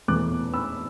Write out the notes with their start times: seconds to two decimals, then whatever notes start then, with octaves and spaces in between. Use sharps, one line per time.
0.08 E2 B2 A3 D6 F#6
0.54 B5 E6